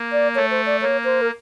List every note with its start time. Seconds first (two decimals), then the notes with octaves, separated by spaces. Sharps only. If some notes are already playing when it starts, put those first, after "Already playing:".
Already playing: A#3
0.12 D5
0.35 A3 C#5
0.51 C5
0.66 D5
0.81 A#3 C#5
1.04 C5
1.21 A#4